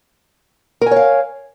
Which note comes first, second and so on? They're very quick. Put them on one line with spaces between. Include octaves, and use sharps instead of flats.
A#4 G#5 C#5 F5